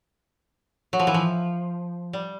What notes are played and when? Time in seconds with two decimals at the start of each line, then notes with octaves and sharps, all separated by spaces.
0.93 F#3
0.99 F3
1.07 E3
1.14 F3
2.13 G3